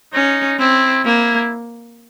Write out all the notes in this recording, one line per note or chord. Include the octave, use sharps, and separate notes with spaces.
C#4 D#4
C4 E4
A#3 E4